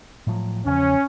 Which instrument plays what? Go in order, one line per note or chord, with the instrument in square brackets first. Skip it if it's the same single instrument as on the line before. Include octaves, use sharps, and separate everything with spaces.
[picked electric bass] A2 F3 F#3
[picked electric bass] E2 C#3 F3 [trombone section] C#4